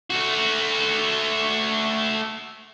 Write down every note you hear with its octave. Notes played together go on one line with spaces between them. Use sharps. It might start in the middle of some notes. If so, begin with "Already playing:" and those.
A3 F#4